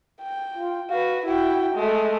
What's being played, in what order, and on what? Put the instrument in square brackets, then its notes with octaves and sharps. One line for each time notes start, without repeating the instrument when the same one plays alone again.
[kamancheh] G5
[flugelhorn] F4
[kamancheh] F#4 B4 [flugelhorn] F5
[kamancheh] E4 G5 [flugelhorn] F#4
[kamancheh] G#3 A3